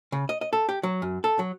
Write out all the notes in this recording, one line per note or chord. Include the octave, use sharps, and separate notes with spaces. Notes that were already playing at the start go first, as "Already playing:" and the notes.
C#3
D#5
D#5
A4
G4
F#3
F#2
A4
F#3